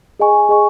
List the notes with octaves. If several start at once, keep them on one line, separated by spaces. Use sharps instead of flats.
G#4 D#5 G#5 C#6
G#4 D#5 G#5 C#6